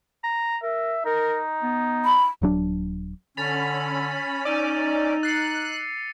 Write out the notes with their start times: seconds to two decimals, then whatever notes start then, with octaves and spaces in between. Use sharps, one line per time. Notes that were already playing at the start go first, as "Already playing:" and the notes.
0.24 A#5
0.63 A#4 E5
1.06 D#4 A#4
1.63 B3
2.05 B5
2.42 D#1 F#3 D4
3.37 D3 C#4 B5 A6 F7
4.45 D#4 D5 D6 E6 D#7
5.23 F#6 A6 C7 C#7